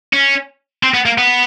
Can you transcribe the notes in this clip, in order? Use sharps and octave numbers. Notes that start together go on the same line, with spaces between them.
C#4
C4
B3
A#3
B3